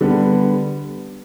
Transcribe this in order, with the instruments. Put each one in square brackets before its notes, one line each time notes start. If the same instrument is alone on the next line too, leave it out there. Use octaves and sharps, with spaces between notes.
[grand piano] D3 G3 B3